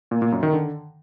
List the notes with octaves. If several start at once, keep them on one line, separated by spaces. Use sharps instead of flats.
A#2
A#2
F#2
D#3
D3